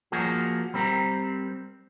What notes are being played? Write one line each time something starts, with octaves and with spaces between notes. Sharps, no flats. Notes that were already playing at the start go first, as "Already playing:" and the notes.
F3 A#3 F#4 G#4
G3 C4 A#4